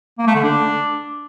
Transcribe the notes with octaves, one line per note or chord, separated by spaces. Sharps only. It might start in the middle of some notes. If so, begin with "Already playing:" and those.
A#3
A3
D3
D4